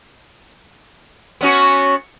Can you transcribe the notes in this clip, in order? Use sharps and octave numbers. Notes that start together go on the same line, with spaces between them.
B3 C#4 F#4